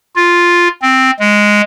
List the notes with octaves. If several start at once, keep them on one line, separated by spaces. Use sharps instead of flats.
F4
C4
G#3